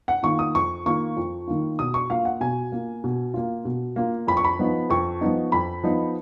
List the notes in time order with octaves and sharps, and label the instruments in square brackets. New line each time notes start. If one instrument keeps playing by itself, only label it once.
[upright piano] F#5
D#3 A#3 F4 C#6
D#6
F2 C#6
D#3 A#3 F4 C#6
F2
D#3 A#3 F4
B2 D#6
C#6
A#3 F4 F5
F#5
B2 G#5
A#3 F4
B2
A#3 F4
B2
A#3 F4
F2 B5
C#6
B5
F3 B3 D#4
F2 C#6
F3 B3 D#4
F2 B5
F3 B3 D#4